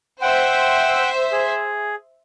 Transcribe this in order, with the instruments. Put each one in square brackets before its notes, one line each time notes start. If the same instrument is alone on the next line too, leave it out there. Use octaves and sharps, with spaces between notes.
[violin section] C5 E5 [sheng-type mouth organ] F#5 G5
[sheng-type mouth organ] G#4